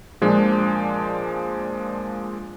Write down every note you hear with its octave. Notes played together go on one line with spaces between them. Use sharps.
A#2 F3 G#3 D4